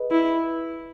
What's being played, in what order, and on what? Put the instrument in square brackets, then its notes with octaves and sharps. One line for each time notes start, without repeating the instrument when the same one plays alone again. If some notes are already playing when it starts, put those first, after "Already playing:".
Already playing: [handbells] G#4 B4 D#5
[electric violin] E4